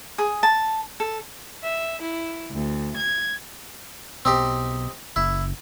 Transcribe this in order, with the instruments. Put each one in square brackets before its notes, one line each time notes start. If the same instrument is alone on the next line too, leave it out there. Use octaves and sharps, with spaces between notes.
[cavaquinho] G#4
A5
A4
[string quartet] E5
E4
D2
G#6
[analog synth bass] B1 [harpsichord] C4 D#4 G4
[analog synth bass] F#1 [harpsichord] E4